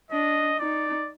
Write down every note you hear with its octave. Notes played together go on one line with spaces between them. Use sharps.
D4 D#5
D#4 D5